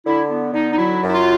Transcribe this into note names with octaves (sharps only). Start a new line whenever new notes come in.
D3 E4
B3
D3 D#4
D#4
F#3 E4
F#2
E4
F4